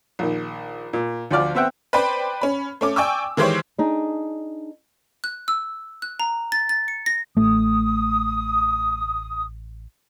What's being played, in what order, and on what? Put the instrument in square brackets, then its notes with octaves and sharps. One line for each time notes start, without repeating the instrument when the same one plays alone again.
[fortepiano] A#1 D#3
A#2
D2 F3 F4 D5 F6
B3 C4 E5 F#5 G5
[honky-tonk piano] B4 C5 D5 G5 B5
C#4 B5
A3 C#4 D6
D5 G5 G#5 C#6 D6 E6
D#3 E3 G#3 G4 C5 C#5
[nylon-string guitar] D4 D#4 G#4
[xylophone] F#6
E6
F#6
A#5
A6
A6
C#7
A#6
[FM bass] A1 [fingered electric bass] A3 [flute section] D#6